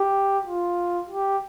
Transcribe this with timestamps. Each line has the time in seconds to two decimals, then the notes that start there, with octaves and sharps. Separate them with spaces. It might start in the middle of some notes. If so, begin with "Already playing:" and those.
Already playing: G4
0.45 F4
1.09 G4